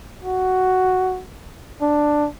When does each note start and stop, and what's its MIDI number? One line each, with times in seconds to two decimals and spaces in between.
0.24 1.22 66
1.81 2.27 62